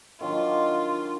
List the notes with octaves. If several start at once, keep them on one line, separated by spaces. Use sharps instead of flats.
D#3 F#3 D4 F4